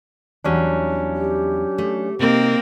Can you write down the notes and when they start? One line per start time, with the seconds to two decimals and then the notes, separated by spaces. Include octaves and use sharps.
0.44 E2 F#3 G3 C#4 D4 E4
1.15 G4
1.78 A3
2.19 C3 A#3 C4 D#4